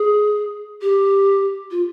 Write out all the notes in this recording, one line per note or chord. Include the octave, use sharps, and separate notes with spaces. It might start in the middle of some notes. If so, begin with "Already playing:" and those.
Already playing: G#4
G4
F4